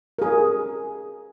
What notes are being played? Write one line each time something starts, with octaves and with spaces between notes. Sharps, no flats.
G#4 A#4